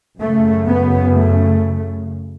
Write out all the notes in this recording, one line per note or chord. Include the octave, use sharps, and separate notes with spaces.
F#2 C#3 A3
B3
A3